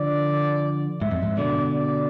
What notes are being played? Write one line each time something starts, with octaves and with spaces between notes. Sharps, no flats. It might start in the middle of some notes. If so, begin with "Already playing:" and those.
Already playing: D3 F3 D5
G#2 E5
F2
G#2
B2 D3 D5
D5